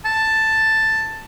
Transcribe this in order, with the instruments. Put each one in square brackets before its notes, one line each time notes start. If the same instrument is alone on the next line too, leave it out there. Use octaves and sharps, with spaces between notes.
[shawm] A5